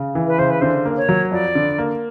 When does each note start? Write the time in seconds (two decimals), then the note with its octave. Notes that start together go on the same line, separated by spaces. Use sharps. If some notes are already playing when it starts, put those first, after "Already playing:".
Already playing: C#3
0.15 E3
0.27 B4
0.39 C#3 C5
0.50 B4
0.61 D3 C5
0.85 A#3
0.97 C#5
1.09 F#3
1.32 F2 D5
1.55 D3
1.78 A#3